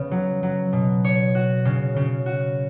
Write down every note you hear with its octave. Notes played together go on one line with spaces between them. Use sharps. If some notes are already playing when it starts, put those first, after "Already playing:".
Already playing: C#3 B3
F#3
F#3
B2
C#5
F#4
C#3
C#3
F#4